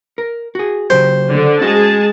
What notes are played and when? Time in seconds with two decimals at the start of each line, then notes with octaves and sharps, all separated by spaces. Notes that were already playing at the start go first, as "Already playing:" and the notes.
0.18 A#4
0.55 F#4 G#4
0.90 C#3 F#3 G4 C5
1.32 D3 D4
1.61 G#3 C#4 F#4 G#4 D#5 A5